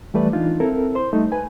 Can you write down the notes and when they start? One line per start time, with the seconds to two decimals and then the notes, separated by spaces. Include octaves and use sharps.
0.14 E3 G3 A3 B4 D5
0.33 E3 D4 D#4 F4
0.60 C4 E4 A4 A#4
0.95 C5 C6
1.13 G3 A3 D#4
1.32 B4 G#5